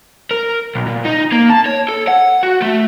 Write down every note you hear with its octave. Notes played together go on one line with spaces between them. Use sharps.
A#4
B1
A#2
D#4
A#3
A5
C#5
A4
F#5
F#4
A3